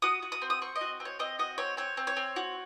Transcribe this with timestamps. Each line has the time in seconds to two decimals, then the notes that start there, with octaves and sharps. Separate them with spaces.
0.02 F#4 D#6
0.22 F#4
0.32 D#6
0.42 C4
0.50 D#6
0.62 C4 C#6
0.76 D#5
0.81 F#4
1.00 C4
1.05 C#5
1.19 C4 D#5
1.39 F#4 D#5
1.58 C4 C#5
1.77 C4 C#5
1.97 C4
2.07 C#5
2.17 C4
2.36 F#4